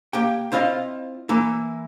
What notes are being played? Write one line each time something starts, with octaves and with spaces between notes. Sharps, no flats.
A#3 G4 G5
C4 E4 F4 D#5 F5
E3 A#3 E4